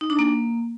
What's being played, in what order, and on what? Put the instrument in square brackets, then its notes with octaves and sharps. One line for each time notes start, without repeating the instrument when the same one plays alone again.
[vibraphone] D#4
D4
A#3